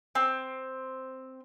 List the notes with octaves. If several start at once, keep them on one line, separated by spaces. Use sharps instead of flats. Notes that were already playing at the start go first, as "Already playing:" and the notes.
C4